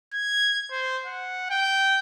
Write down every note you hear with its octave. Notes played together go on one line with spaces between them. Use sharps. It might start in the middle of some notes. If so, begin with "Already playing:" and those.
G#6
C5
F#5
G5